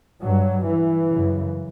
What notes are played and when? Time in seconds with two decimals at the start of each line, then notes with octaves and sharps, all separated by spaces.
0.23 G2 F#3
0.66 E3
1.09 F#2 C#3